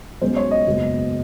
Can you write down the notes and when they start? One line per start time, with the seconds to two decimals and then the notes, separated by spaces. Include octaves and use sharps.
0.21 B1 B2 G#3 C#4 C5
0.37 C#5
0.51 D#5
0.66 F#1 E2 B2 G#3